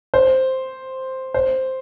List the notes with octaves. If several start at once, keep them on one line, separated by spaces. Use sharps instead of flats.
C5
C5